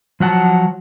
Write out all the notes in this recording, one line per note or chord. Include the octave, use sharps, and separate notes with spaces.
F3 F#3 F#5 A5